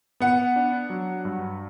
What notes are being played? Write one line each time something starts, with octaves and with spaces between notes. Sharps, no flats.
B3 F#5
D4
F#3
G2